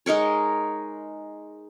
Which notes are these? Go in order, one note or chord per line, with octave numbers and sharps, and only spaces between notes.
G#3 D#4 A#4 C#5